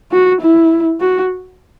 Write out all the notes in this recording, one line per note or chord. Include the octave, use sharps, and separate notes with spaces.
F#4
E4
F#4